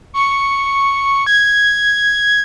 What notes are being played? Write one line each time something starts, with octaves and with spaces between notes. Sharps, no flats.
C#6
G#6